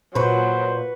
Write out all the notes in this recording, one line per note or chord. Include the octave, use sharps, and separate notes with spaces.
A#2 F#3 B4 C5 C#6